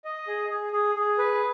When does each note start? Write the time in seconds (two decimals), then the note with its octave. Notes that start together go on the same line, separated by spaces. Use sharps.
0.05 D#5
0.27 G#4
0.50 G#4
0.73 G#4
0.95 G#4
1.18 B4